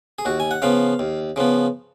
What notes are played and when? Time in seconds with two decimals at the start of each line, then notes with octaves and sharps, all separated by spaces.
0.19 G#4
0.25 D#2 F#4
0.40 G#5
0.51 F#5
0.62 C#3 F3 B3 F5
0.99 D#2
1.36 C#3 F3 B3